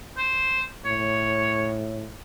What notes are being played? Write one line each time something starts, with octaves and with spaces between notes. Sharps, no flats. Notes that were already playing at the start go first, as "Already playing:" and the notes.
C5
A2 C#5